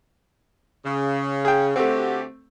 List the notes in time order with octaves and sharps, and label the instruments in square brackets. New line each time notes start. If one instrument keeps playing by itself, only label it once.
[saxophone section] C#3
[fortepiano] G#4 G5
[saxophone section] D3 F#4 G4 [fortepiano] A3 C4